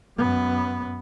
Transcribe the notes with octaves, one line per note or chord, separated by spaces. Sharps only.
F#2 B3